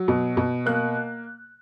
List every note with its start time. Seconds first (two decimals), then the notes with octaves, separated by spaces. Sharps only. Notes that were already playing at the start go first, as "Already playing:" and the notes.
Already playing: F#3
0.08 B2
0.37 B2
0.66 A#3 F#6